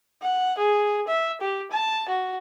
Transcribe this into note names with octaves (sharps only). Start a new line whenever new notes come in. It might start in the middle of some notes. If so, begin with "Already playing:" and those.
F#5
G#4
E5
G4
A5
F#4